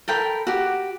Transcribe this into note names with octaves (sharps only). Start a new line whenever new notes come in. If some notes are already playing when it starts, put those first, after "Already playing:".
A4 A#4 G5 B5
F#4 G4